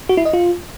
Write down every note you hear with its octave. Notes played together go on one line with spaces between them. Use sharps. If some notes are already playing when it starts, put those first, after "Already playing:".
F#4
E4
D#5
F4